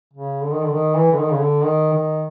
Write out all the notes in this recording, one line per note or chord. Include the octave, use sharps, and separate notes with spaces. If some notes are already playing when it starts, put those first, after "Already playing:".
C#3
D3
D#3
D3
D#3
E3
D3
D#3
C#3
D3
D#3
D#3